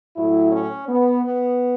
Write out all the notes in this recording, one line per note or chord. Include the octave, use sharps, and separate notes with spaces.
A2 F#3 E4
C#4
B3
B3